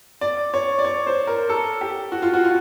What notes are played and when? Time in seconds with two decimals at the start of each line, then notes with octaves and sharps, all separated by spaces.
0.21 D5
0.54 C#5
0.79 D5
0.85 C#5
1.07 C5
1.27 A#4
1.49 A4
1.81 G4
2.12 F#4
2.22 F4
2.34 F#4
2.44 F4